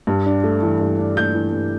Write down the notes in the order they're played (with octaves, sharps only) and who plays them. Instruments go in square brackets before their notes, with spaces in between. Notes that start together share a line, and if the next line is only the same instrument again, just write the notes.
[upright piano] G2
D4
A3
E3
G2
D4
A3 G6
E3
G2